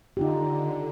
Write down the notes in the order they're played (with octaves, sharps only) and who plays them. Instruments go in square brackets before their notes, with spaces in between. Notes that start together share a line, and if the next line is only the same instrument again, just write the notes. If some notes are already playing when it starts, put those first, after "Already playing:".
[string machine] D3 [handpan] D#4 F4 G4